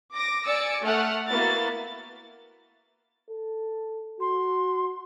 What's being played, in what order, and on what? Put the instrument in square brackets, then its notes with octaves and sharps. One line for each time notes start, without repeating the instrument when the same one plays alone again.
[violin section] D6 A#6
D5 G#5 E6 A6 C#7 D7
A3 F#5 F6
A#3 B3 E4 F#4 A6
[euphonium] A4
[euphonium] F#4 [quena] C6